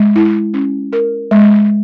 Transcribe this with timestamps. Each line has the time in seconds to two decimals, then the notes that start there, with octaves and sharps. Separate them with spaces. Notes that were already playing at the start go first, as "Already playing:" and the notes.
Already playing: G#3
0.16 E4
0.54 C#4
0.93 A#4
1.31 G#3